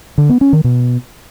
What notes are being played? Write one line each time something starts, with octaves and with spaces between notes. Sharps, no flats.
D3
B3
C#4
D#3
B2